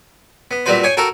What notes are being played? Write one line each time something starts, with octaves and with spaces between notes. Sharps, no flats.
B3
A#2 G3 C4 F#4 B4 C5
G#4 C#5 G5 G#5
F#4 A4 A#4 G5